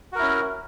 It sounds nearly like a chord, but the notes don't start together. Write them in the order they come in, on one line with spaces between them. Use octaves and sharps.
F#4 A#4 E4 C#4